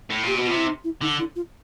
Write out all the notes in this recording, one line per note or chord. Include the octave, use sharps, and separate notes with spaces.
A2
A#2 G4
B2 F#4
C3 F4
E4
D#4
E4
D3 D#4
E4
F4